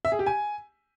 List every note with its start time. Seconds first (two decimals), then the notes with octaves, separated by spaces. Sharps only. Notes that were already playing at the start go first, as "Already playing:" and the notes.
0.05 E5
0.12 G#4
0.19 G4
0.26 G#5